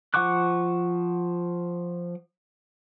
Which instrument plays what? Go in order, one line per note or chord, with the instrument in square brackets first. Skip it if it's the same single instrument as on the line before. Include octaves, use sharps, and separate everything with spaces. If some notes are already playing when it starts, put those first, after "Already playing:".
[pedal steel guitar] F3 F#5 C#6 D6 F#6